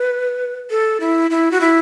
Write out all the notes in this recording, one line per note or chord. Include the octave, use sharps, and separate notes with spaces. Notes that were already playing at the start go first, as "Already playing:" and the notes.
Already playing: B4
A4
E4
E4
F#4
E4